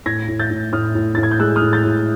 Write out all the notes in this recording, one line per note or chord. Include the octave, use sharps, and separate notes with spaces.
A2 G#6 A#6
A2
G6 A6
A2
A2 D#6 F6
A2
A2 A6
G#6
G6
G#3 E6 F#6
D#6 F6
A2
G6 A6
A2